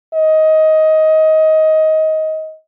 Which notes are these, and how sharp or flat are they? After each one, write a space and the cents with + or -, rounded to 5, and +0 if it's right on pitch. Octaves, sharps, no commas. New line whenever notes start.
D#5 +15